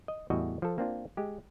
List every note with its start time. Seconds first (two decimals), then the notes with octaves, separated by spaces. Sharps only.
0.08 D#5
0.30 E2 A2 G3 F#4 D#5 E5
0.62 F3 A4
0.78 A#3 C4 D4 F4
1.17 G#3 G4